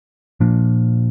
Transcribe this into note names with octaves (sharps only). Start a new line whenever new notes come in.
A#2 F3 A#3 D4